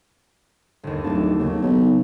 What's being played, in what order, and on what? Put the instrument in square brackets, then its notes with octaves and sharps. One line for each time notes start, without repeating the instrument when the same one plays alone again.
[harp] G1 D#2
[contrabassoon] D1 [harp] A5
[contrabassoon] D#2 [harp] C#3 F#3
[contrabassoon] B1